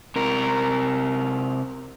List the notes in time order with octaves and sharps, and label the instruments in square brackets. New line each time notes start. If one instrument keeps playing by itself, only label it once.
[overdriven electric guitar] C3 A#4